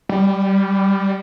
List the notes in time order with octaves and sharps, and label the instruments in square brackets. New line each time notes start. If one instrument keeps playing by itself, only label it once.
[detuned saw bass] G3